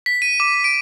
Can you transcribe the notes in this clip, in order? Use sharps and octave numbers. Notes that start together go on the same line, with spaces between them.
B6
D#7
D6
D7